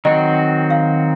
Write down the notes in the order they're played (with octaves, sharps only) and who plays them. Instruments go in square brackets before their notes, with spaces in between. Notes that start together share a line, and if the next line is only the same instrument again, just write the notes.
[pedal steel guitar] D#3 F#3 C4 F#4 [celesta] D#5
[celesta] F5